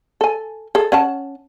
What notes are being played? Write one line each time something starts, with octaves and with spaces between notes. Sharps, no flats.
A4 G#5
G#4 A4
C#4 F#5 A5